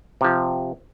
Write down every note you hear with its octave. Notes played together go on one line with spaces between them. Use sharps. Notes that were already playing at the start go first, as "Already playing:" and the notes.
C3 F3